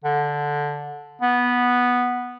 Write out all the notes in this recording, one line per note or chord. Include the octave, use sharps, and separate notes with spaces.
D3
B3